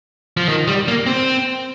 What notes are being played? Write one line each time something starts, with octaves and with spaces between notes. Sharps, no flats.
F3
D#3
G3
A#3
C4